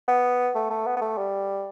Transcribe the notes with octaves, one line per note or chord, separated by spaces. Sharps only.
B3
A3
A3
B3
B3
A3
G3